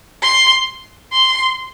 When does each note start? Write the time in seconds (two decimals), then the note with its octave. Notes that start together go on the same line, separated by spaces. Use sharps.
0.23 C6
1.13 C6